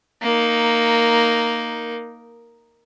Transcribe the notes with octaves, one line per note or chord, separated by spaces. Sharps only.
A#3 D#4